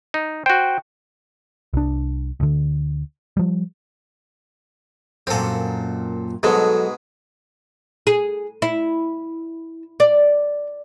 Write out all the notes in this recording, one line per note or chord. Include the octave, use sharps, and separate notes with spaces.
D#4
F#4 C5 G5
C2 D4
D2 D3
F3 G3
F#2 A#2 C4 A4
G#2 B2 F#3 G#3 A4
G#4
E4
D5